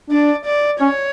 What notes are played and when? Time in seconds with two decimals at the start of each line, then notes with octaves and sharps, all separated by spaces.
0.11 D4 D5
0.45 D5
0.81 C#4 C#5